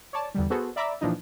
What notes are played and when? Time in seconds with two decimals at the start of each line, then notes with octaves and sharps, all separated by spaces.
0.13 C#5 D5 A5
0.35 E2 D3 G3
0.50 B3 F#4 G#4 A4 C5
0.76 D5 E5 A#5 B5 D6 E6
1.01 A#2 E3 F3 D4 D#4